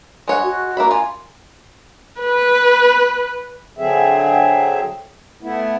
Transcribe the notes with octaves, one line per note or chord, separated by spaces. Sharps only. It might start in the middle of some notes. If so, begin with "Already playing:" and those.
G#3 C#5 F#5
F#4
A#3 E5 B5
F4 G#5
B4
D3 F#3 C4 G#4 E5
A3 B3 E4